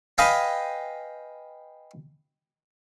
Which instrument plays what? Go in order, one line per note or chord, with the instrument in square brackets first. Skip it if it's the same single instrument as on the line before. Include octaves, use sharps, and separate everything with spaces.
[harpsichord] B4 D#5 F5 G5 G#5